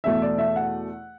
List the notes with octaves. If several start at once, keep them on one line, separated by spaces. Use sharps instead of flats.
E2 B2 A3 E5
D5
E5
F#5